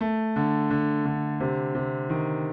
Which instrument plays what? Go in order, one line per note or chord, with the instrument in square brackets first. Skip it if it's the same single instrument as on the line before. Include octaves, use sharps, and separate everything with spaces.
[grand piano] A3
D3
D3
D3
C3
C3
D#3